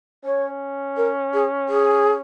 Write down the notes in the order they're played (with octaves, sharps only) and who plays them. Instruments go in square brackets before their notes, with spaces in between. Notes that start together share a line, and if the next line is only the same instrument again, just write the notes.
[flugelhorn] C#4 [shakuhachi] C#5
[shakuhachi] A#4
G#4
G#4